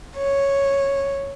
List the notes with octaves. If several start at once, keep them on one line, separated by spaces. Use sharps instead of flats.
C#5